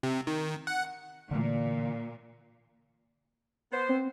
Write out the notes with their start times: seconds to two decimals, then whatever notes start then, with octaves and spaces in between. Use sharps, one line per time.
0.03 C3
0.27 D#3
0.67 F#5
1.31 A#2 D3 E3
3.71 B3 C5
3.89 C4